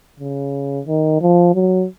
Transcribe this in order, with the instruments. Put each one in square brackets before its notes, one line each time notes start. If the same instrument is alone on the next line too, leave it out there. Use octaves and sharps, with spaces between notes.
[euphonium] C#3
D#3
F3
F#3